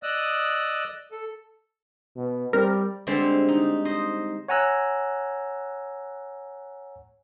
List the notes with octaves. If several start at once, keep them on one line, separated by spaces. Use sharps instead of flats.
D5 D#5 D#6 E6 F#6
A4
B2
G3 C4 A#4
D3 G3 G#3 C4 C5
D#4
C5 D#5
C#5 F#5 G#5 A#5 E6 F#6